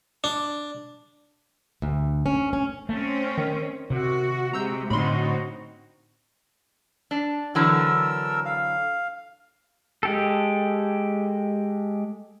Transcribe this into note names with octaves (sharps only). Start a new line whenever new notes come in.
D4
D2
C#4
C#4
A3 C4 C#4
D#3
C3 F#4
C3 G#3 F#4 A#5 E6 G6
A2 D3 C4 D#4 F#4 B5 C6
D4
D3 E3 F#3 A4 A#4 E6
F5
G#3 G4 A4